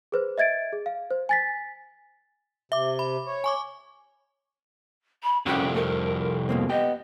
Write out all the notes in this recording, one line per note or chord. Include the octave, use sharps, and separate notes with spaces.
G#4 B4 C5
D#5 E5 G#6 A6 D7
G#4
F5
C5
G#5 A6 B6
C3 E5 D6
B5
C#5
G#5 C#6 D6
B5
C2 F2 C#4 F#4 G4 G5
A3 A#4
B2 A#3 C4
B3 G4 D#5 G5